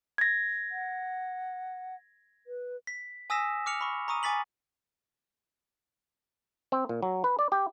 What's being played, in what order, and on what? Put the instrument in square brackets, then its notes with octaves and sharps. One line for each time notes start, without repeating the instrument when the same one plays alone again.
[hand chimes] G#6 A#6
[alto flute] F#5
B4
[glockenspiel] B6
G#5 D#6 E6 A#6 B6 E7
D6 F6 C#7 F7
B5 C#6
A#5 C#6 D#6 D#7
G#5 D6 A6 B6 F#7
[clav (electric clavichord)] C4
A#2
F#3
B4
D5
G4